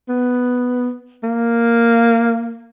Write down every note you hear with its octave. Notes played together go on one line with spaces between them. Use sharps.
B3
A#3